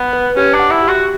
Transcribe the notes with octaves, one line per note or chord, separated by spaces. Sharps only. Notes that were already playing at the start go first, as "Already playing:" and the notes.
Already playing: B3
B4
C#4 G4
D4
F#5
E4
G4
F#4